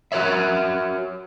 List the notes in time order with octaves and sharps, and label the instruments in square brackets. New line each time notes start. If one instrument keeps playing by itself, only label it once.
[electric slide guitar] F#4 A#4 C#5 E5